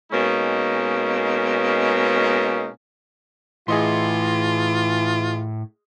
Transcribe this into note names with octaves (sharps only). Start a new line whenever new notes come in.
B2 G#3 A#3 C#4 D#4
A2 E3 F4 G#4 D#5 C6